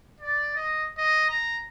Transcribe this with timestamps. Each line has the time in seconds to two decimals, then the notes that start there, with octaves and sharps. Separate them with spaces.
0.20 D5
0.56 D#5
0.98 D#5
1.30 A#5